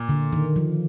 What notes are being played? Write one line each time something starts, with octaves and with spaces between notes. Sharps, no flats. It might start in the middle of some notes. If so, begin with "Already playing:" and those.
Already playing: A#2
D3
D#3
F3